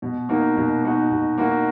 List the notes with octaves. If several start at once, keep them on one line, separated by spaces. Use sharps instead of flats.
B2
A#3 D#4 F#4
B2
A#3 D#4 F#4
B2
A#3 D#4 F#4